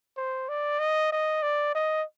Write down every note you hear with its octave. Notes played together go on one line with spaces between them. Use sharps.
C5
D5
D#5
D#5
D5
D#5